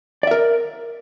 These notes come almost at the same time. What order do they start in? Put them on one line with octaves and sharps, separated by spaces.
D5 E5 A#4